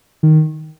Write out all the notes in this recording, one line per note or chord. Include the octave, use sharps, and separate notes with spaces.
D#3